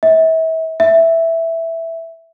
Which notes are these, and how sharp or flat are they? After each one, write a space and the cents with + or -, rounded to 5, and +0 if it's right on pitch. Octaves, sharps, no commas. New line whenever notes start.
E5 -35
E5 +0